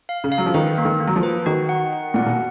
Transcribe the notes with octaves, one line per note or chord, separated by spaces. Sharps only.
F5
C#3
F5
F#3
F3
D#3 B4
A#3
D#3
A#3
F#3
F3
B4
D#3 F#4
F#5
F#5
A#2 F#5
B2